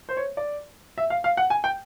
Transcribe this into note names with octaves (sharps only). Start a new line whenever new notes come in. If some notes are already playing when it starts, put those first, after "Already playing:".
C5
C#5
D5
E5
F5
F5
F#5
G#5
G5